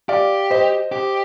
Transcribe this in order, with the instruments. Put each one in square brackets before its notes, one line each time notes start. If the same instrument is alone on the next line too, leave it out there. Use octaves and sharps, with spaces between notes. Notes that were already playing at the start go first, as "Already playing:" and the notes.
[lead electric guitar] G4 [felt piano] D5 F5
[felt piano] C5 D#5
[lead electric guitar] G4